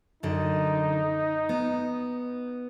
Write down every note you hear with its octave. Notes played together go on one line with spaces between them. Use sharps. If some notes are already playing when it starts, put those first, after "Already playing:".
F#2 D3 D#4
B3